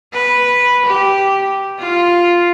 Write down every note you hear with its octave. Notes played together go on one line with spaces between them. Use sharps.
B4
G4
F4